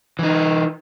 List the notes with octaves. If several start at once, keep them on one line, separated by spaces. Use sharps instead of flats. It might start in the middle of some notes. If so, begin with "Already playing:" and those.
E3 D#4